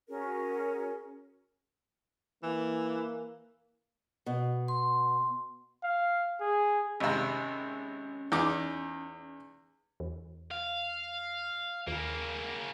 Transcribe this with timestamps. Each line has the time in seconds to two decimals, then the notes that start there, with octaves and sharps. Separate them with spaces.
0.08 C#4 F#4 G#4 A#4
2.43 E3 A#3
4.26 B2
4.68 C6
5.83 F5
6.41 G#4
7.00 G#1 C3 C#4
8.32 E2 D#4 D6
10.00 E2
10.51 F5
11.87 D#2 C#3 A#3